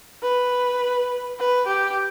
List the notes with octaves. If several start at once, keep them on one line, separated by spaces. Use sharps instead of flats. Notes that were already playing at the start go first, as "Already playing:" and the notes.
B4
B4
G4